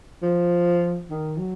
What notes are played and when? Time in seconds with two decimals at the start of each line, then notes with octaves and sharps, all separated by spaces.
0.22 F3
1.10 D#3
1.38 F#3